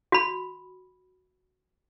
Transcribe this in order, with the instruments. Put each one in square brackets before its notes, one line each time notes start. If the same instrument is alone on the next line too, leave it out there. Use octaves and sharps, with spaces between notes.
[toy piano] F#4 B5